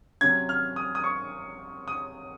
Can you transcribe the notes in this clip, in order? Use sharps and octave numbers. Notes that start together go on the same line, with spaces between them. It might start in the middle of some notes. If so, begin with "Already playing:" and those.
C3 F#3 C#4 G#6
F6
D#6
D#6
C#6
D#6